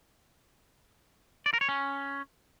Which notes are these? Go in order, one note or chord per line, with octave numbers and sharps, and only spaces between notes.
D5
A#4
C#5
C#4